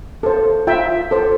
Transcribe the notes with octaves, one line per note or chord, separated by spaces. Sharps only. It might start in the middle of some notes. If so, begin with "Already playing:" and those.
A4 C5
F4 E5 G5
A4 C5